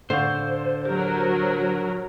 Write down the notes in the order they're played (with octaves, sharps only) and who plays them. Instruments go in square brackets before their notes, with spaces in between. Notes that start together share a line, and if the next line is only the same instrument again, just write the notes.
[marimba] A2 F5 F#5 [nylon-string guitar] D3 [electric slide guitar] C5
[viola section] F#3 A#4 [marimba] G4